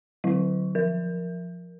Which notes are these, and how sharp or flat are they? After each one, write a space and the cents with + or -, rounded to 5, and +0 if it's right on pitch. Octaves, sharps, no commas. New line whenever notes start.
D3 +25 F#3 +0 E4 +0
F3 +0 A#4 +0